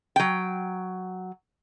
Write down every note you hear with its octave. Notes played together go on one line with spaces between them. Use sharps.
F#3 G5